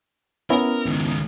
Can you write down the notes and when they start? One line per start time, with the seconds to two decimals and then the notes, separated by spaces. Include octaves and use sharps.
0.50 B3 C#4 E4 A#4
0.86 C#2 D#3